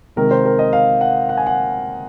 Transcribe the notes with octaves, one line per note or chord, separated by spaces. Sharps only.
C3 D#3 G#3 A#4
C5
A#4
D#5
F5
F#5
F#5
G#5
F#5